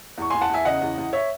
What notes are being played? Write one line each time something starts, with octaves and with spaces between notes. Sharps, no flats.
E2 C#6
E2 G#5 C6
F#5 A5
E2 E5 G#5
C#3 D#5 F#5
E2
E2
C#5 E5